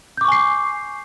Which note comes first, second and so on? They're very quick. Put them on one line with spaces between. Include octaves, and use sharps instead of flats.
G6 D6 C#6 G#5 C7